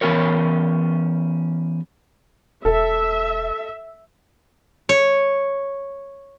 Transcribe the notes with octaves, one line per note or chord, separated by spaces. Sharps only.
E3 B3 C#4 G4 A#4 C#5
E1 A4 E5
C#5